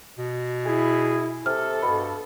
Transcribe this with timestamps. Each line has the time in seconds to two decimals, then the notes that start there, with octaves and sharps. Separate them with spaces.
0.18 B2
0.66 E4 G#4
1.46 C3 A4 F6
1.82 G2 B2 B5